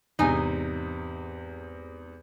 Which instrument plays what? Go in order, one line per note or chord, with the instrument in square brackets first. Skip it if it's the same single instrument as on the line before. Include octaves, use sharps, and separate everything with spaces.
[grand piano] E2 G#2 C3 [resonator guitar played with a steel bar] D#4 G#5